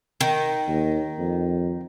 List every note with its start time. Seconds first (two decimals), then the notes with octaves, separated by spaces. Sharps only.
0.21 D#3
0.68 D#2
1.19 F2